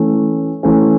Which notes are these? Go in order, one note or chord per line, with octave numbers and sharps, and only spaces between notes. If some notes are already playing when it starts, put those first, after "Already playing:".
Already playing: E3 A3 C#4
E3 A3 C#4